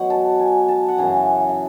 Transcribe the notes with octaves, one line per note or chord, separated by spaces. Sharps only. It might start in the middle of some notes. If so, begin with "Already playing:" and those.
Already playing: B2 F#3 F#5
A5
G#5
A5
F#5
F#2 C#3 E3 G#5
E5